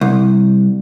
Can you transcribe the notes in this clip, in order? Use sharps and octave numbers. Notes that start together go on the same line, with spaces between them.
C2